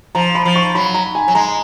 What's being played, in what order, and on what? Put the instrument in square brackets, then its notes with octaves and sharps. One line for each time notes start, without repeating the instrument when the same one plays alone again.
[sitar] F3 [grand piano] A#5
[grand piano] B5
[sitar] F3
[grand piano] C#6
[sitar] F#3 [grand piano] B5
[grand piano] A#5
G#5
[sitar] F#3
[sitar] G#3 [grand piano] A#5